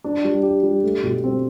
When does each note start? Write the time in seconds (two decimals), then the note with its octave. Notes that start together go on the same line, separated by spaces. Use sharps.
0.04 D4
0.24 G3
0.43 G4
0.63 G3
0.83 A3
1.03 B2
1.24 C4